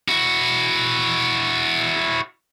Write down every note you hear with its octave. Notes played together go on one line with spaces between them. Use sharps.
E4 F#4